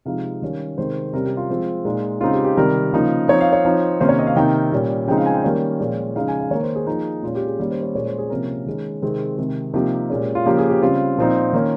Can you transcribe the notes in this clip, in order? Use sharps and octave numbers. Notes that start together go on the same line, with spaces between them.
C3 F3 G#3 D#4 F5
D#3 G3 C#4
C3 D#3 G#3 C5
C3 G3 C#4 A#4
G4
F4
F3 G#3 C4
A#2 G#3 D#4
C#3 G#3 C4 D#4 F4
G4
G4
C3 D#3 G3 A#4
C#3 F3 A#3 D#4
F3 C4 D#4 C#5
F5
C#5
F3 C4 D#4
C3 D#3 A#3 C#4 C5
C#5
D#5
F5
C3 D#3 A#3 D#4 G5
A#2 G3 C#4
C#3 F3 G#3 C4 D#4 G5
F5
G#5
G5
D#3 G3 A#3 C#4
A#2 F3 G#3 C#4
C#3 F3 G#3 D#4 F5
G#5
F5
D#3 A#3 D#4 C#5
C5
G#4
F3 A#3 D#4
A#2 G#3 C#4 F4
G4
G#4
D#3 G3 A#3 C#4
C5
C#5
A#2 G#3 C#4 C#5
C5
G#4
C3 F3 A#3 C#4 A#4
D#3 G#3 C#4
C3 D#3 G#3 C4 G#4
C3 D#3 G#3
C3 F3 A#3 D#4 G4
A#2 G#3 C#4
F4
C#3 F3 A#3 C#4 G4
G#4
G4
C#3 G3 C4 F4
A#2 F3 C4 D#4
D#3 A#3 C#4